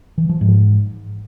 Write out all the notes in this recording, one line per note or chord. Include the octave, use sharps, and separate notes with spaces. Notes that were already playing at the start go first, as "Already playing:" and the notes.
E3
F3
G#2